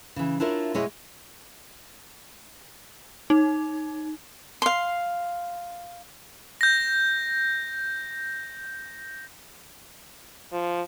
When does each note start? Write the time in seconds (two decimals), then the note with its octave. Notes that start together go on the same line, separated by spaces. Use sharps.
0.16 C#3 E3
0.40 D4 E4 F4 A#4 C#5
0.74 B2 G#3 E4 C#5 D#5
3.30 D#4
4.62 F5 C6
6.61 G6 A#6
10.52 F3